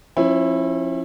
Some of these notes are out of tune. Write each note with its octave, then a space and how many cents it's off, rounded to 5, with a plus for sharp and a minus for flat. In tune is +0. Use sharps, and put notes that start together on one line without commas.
F3 +0 C#4 -40 E4 +0